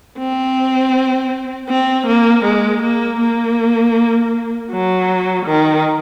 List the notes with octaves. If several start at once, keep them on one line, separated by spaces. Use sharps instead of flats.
C4
C4
A#3
G#3
A#3
A#3
F#3
D#3